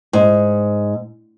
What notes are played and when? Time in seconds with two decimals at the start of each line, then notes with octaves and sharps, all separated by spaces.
0.13 G#2